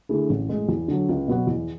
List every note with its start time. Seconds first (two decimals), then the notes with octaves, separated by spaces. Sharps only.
0.09 D3 A3 E4 G#4
0.29 A1
0.49 A2 G#3
0.68 E2
0.88 D3 F#3
1.09 C#2
1.28 B2 F#3 B3 F#4
1.47 E2